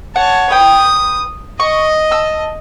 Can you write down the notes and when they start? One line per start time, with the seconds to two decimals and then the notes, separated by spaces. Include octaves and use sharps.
0.16 C#5 F#5 A5
0.51 B4 G5 D#6
1.60 D#5 C#6
2.11 A5 E6